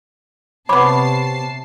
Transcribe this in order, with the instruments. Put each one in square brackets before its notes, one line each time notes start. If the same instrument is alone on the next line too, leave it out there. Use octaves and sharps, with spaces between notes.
[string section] C3 A5 C7 [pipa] B3 C#5 [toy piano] B5 [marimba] D6